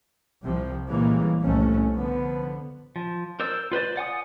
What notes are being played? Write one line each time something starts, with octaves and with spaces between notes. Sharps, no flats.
C2 C3 F3
A#2 C#3 E3 G3 G#3 A#3
C2 F2 A2 C3 A3 C#4
D3 F3 B3
F3
A#4 C5 D5 E6
F4 B4 C5 D5
D5 F#5 G#5 D#6